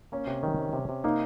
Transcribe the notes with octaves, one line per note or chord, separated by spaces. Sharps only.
A#3 C#4
C3
D#3
C3
C3
C3
A#3 D#4